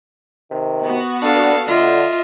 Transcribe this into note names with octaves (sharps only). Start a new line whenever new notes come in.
C3 D#3
B3 F#4
D4 A4 F5
D3 F4 D#5 E5